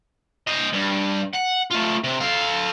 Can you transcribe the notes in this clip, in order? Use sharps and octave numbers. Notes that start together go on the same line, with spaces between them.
C5 D#5
G2
F#5
A3 F4
C3
A4 F5